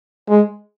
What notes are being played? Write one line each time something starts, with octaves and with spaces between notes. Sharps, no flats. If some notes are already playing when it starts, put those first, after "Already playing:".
G#3